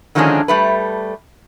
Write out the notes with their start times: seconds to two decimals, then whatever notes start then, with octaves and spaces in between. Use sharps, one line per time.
0.15 D3 D#3 F3 G#3 C#4 D4
0.48 G3 A3 B4